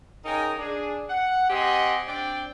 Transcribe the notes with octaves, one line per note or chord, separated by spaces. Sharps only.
C#3 D#4 A#4 G5 G#5
D4 G#4
F#5
C4 G4 D#5 F#5 G#5 C6
C4 D4 D5 G5